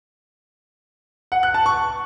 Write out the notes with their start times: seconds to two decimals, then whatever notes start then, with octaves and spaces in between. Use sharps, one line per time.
1.32 F#5
1.43 F#6
1.54 A5
1.66 C#6